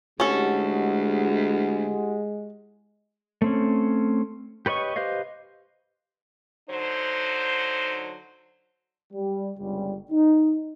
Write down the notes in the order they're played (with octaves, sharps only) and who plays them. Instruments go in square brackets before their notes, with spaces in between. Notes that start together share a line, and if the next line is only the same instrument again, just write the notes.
[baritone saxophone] D2 [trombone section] G#3 [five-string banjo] C#4 A4 [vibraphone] E4 G4 F#5
[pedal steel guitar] A3 C4 C#4
G4 B4 C#5 D#5 C#6
G4 B4 C5 D#5 F5
[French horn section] D3 F#3 D#4 C5
[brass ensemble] G3
G1 C#2 G3
D#4